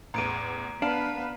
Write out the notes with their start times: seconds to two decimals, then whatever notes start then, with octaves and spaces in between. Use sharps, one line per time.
0.14 A1 E2 A#5 D7 D#7
0.82 B3 D4 B4 F5